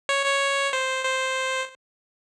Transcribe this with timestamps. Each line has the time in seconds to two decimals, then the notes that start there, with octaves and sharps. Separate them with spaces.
0.09 C#5
0.26 C#5
0.73 C5
1.05 C5